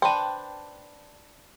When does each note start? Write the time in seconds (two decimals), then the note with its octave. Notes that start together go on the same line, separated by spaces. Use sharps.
0.02 D4 B4 C5 G5 A5